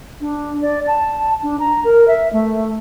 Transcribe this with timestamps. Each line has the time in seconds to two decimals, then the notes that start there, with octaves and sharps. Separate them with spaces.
0.21 D4
0.62 D5
0.87 A5
1.43 D4
1.60 A#5
1.84 A#4
2.08 E5
2.33 A3